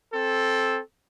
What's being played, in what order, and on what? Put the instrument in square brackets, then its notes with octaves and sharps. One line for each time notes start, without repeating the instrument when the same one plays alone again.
[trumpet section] C4 A4